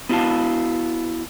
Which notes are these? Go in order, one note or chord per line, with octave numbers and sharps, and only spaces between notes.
B3 E4 F#4 B4 F5 A5